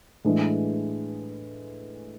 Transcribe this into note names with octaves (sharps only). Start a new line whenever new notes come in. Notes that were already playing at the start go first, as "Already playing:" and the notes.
A2 E3 G#3 D4 G#4